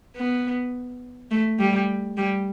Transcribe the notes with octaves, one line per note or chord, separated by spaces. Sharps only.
B3
A3
G3
G3